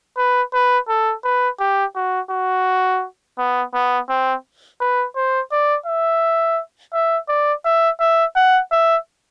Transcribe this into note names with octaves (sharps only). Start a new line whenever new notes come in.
B4
B4
A4
B4
G4
F#4
F#4
B3
B3
C4
B4
C5
D5
E5
E5
D5
E5
E5
F#5
E5